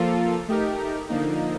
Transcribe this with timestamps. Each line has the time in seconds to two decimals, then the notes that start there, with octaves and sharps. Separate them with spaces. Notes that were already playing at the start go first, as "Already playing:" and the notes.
Already playing: F3 A#3 F4 A4
0.48 A3 D#4 G4 A#4
1.09 D3 F3 A#3 D#4